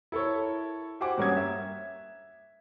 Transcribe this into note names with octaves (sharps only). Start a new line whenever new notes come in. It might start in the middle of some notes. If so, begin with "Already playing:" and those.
E4 A4 A#4 C#5
F#4 G4 C5 F#5 G#5 D6
G2 A#3 C#4 F#5 D#6 G#6
E5